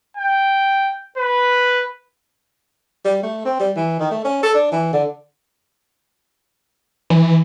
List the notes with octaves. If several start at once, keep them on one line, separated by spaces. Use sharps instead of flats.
G5
B4
G3
A3
C4
G3
E3
D#3
A3
C#4
A4
D4
E3
D3
E3